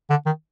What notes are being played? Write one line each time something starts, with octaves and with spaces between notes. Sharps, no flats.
D3
D#3